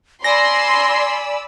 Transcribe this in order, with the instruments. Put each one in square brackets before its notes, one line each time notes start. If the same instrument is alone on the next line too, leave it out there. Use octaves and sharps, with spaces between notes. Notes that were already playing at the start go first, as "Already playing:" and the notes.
[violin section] D5 B5 E6 [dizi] G#5 [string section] C6 [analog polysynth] A#6